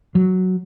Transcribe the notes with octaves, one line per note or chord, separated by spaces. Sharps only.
F#3